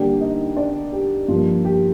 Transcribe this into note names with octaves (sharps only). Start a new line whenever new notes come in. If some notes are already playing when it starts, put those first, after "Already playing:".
Already playing: D3 G3 A#3 D4 G4 G5
D#4 D#5
D4 D5
G4
G2 F3 A#3 F4
G4